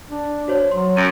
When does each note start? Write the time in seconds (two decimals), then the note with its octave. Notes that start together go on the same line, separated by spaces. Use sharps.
0.07 D4
0.48 F#4 C5 C#5
0.71 F#3 C6
0.97 F#2 D7 D#7